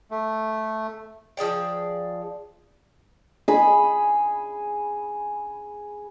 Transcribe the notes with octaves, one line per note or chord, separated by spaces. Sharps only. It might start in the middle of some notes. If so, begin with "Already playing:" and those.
A3
F3 G#4 D5 G5
G#4 B5